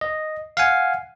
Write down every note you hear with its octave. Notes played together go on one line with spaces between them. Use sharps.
D#5
F5 F#5 G#5